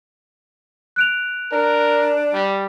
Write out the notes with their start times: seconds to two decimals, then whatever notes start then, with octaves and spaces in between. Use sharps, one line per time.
0.96 F#6 D7 F7
1.52 D4 A#4
2.33 G3